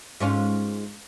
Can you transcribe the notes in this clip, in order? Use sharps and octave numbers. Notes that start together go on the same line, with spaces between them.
G#2 C#4 F4